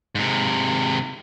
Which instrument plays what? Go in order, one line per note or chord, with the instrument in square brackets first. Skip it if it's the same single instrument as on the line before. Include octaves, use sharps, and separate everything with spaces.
[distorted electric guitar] G#2 C3